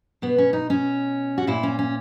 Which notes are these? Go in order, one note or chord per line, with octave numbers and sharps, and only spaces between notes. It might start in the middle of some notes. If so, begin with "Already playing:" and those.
B2 B3
C#4
D#4
C#4
F#4
A#2 E4
C#4
C#4